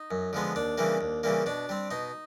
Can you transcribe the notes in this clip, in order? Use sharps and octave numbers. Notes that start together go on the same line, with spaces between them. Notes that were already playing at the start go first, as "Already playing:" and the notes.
Already playing: D#4
F#2
D3 F3 G#3 B3
D#2 D4
C#3 E3 G3 A#3
D#2
C#3 E3 G3 A#3
B2 D4
G3 C4
B2 D#4